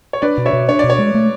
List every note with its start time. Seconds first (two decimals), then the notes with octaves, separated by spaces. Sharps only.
0.13 C#5
0.22 D4 B4 D5
0.38 B2
0.46 C#5 E5
0.53 B2
0.69 D4 C#5
0.79 B2 D5
0.90 C#5
0.98 G#3
1.14 A3